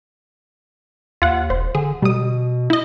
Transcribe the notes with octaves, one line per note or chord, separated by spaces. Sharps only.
D#2 F4 F#5
E1 C5
D3 G#4
B2 G3 D#6
E4 D#5